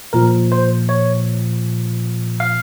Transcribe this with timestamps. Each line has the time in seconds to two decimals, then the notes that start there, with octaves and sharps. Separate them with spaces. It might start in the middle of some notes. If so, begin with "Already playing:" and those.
0.13 A#2 F3 A#4
0.52 C5
0.89 C#5
2.40 F5